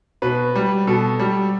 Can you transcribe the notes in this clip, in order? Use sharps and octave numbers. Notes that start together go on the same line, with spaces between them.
B2 B4
G3
B2 A4
G3